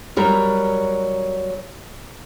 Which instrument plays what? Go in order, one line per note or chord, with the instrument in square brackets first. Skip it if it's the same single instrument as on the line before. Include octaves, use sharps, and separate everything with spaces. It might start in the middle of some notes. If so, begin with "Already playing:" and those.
[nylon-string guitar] F#3 G3 A#4